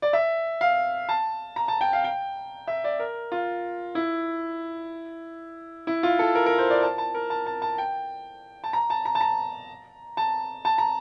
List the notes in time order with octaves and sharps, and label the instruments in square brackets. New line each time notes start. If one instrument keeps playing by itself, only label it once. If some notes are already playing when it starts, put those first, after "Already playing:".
[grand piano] D5
E5
F5
A5
A#5
A5
G5
F5
G5
E5
D5
A#4
F4
E4
E4
F4
A4
A#4
A#4
C5
D5
A5
A5
A#4
A5
A5
A5
G5
A5
A#5
A5
A#5
A5
A#5
A5
A5
A#5